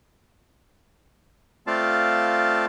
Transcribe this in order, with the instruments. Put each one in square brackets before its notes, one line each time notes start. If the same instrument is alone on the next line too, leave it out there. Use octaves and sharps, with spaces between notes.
[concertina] A3 C4 F4 D5 F5 A5